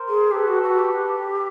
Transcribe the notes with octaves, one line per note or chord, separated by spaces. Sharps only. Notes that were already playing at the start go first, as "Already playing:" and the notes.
Already playing: A#4 C5
G#4
G4 A4 B4
F#4
F#4
G4